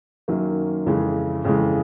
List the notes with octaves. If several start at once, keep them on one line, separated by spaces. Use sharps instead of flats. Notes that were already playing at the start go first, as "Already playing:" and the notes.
F#2 D#3 F#3 A#3 C#4
F2 C#3 E3 G#3
F2 C#3 E3 G#3